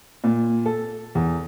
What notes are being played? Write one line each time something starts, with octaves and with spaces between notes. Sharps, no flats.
A#2
A4
E2